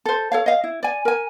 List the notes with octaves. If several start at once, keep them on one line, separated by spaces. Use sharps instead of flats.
A4 C5
A4 C#5 F5
D#5 F5
E4
D5 G#5
A#4 G#5